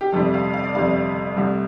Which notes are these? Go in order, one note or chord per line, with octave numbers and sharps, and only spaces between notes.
G4
G1 F2 C3 G3 A4
F5
F5
D5
G1 F2 C3 G3 F5
C2 C3 A3